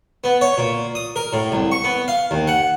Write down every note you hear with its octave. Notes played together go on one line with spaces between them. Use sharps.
B3
C#5
A#2
D#6
A#4
A2
C2
C#6
B3
F5
D#2
F#5